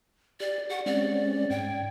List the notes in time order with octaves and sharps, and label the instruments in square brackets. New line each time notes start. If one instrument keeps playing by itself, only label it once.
[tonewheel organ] G4 [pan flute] D5
[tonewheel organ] G4 C#6 [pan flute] F#5
[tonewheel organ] G#3 C4 C#4 [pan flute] D5
[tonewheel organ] G#2 G#6 [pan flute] G5